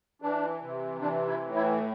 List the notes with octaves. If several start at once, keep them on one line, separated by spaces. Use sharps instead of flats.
E3 D4
C3
E3 D4
E4
A2
E4